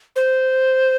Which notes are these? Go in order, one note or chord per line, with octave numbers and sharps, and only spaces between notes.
C5